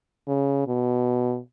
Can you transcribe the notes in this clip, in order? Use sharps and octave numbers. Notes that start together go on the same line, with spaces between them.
C#3
B2